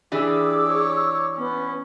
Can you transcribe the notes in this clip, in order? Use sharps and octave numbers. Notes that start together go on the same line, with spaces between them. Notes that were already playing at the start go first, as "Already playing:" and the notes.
E3 D4 G4 G#4 D6 E6
C#5
B3 C#4